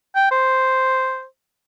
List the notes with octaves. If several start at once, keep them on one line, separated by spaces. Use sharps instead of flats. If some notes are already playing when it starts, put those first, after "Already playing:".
G5
C5